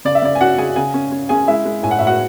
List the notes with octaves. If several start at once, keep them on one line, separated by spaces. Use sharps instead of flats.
C#3 D5
E5
C#3 D5
G#5
C#4 F#4 F#5
C#3 G#4 G#5
C#3 G#4 G#5
C#4
C#4
C#4 G#4 G#5
G#3 E4 E5
G#3
A2 G#5
F#5
A2 E5
F#4 F#5